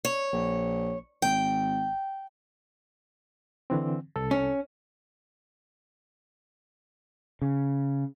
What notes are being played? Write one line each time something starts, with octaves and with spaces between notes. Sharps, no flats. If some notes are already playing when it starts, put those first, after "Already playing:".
C#5
A#1
G#1 G5
D3 E3 C4
C2 A4
C#4
C#3